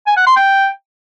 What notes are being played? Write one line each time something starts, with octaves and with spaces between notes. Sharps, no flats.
G#5
F#5
C6
G5